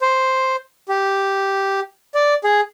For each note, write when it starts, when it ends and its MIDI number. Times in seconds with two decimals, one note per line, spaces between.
0.02 0.56 72
0.89 1.80 67
2.15 2.34 74
2.44 2.61 68